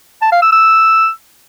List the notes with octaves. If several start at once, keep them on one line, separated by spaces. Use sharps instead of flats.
A5
F5
E6
E6